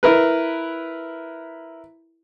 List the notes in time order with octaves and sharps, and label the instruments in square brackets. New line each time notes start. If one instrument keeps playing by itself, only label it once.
[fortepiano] E4 A#4 B4